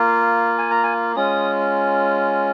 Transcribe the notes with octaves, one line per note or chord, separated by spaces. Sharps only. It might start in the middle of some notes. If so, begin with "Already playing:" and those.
Already playing: A#3 F4
G#5
A#5
G#5
G#3 C#4 F4 D#6